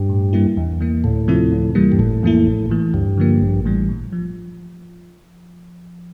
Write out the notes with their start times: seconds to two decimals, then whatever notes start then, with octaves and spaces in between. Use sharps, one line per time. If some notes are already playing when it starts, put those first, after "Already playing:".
Already playing: G2
0.09 A2
0.33 G3 A#3 E4
0.57 E2
0.80 E3 A#3
1.04 D2 A2
1.28 C3 F3 C4 E4
1.52 D2
1.75 C3 E3 G3 A#3
1.92 G2
1.99 G1 A2
2.23 F2 E3 A#3 E4
2.46 A1
2.70 A2 E3
2.94 D2 G2
3.17 D3 F3 A#3
3.41 A1
3.65 A2 E3 G3
3.89 A#2
4.12 F3